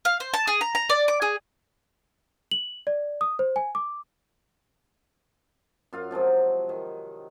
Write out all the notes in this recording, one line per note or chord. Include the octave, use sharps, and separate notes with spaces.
F5
C5
A5
G#4
A#5
A#5
D5
D6
G#4
F#7
D5
D#6
C5
G#5
D6
F#2 F4 F5
C3 F3 F#3 G#3
D#3